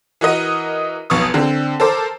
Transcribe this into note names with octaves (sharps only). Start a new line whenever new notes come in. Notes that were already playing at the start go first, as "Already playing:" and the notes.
E3 F#4 A#4 D#5 D#7
F1 B1 B3 C#6 D#6
D3 C4
A4 A#4 C5 D6